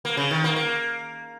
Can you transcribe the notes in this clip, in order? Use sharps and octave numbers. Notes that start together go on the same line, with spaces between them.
A#3
C#3
D#3
A#3
A#3